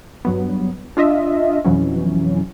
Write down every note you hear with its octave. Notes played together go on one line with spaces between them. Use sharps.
G2 F#3 B3
D4 F4 D#5 E5
F2 B2 E3 F#3 C#4